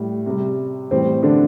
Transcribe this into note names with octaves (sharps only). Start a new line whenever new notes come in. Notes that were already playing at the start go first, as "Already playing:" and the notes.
Already playing: A2 G3
C3 G3
A2 E3 G3 C4
D3 D4